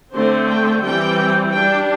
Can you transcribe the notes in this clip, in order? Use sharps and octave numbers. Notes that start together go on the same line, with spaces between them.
D3 A3 C4 C5
G5
E3 G3 C4 G5
G3 D4 G5